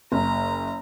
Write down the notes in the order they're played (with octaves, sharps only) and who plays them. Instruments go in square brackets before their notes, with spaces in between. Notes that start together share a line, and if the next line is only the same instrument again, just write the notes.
[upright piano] F#1 [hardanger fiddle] A#5